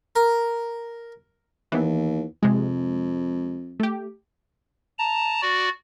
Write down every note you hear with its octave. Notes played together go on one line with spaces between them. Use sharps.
A#4
D#2 E3 B3
F2 C3 G#3
A3 G4
A5 A#5
F#4 D5